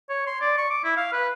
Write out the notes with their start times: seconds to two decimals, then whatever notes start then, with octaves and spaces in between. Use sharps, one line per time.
0.09 C#5
0.27 C6
0.41 D5
0.58 C#6
0.70 D6
0.84 E4
0.97 F5
1.13 B4